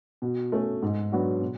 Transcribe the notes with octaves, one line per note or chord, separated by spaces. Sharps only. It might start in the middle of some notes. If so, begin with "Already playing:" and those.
B2
A3 C#4
G#2
F#3 B3 D4 F#4
B2